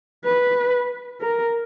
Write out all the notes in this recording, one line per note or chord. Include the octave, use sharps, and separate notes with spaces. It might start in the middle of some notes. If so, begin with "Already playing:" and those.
B4
A#4